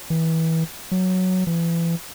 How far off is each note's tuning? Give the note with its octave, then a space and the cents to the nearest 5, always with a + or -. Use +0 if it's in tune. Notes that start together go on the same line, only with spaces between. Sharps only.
E3 -25
F#3 +0
E3 +30